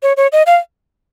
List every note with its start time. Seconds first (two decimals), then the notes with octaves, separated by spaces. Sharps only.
0.03 C#5
0.17 C#5
0.32 D#5
0.46 F5